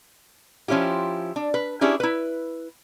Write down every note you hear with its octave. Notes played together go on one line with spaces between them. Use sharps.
F3 C#4 E4 F4 G4
D4
B4
C#4 D4 E4 G4 G#4
E4 B4